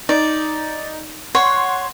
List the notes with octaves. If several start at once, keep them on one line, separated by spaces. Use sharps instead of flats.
D#4 D5
C#5 F#5 C6